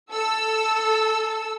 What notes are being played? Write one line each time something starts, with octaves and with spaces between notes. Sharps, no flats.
A4 E6